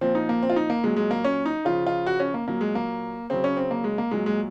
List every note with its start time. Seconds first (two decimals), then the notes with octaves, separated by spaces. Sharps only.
0.01 A#2 F3 C4
0.15 D#4
0.29 A#3
0.43 C4
0.50 F4
0.56 D#4
0.70 A#3
0.83 A#2 F#3 G#3
0.96 G#3
1.11 A#3
1.24 C#4
1.46 D#4
1.65 C#3 F3 F4
1.87 F4
2.07 F#4
2.20 C#4
2.34 A#3
2.47 A#2 F#3 A#3
2.61 G#3
2.75 A#3
3.30 C#3 F#3 C4
3.44 C#4
3.57 C4
3.71 A#3
3.84 G#3
3.98 A#3
4.11 A#2 F#3 G#3
4.26 G#3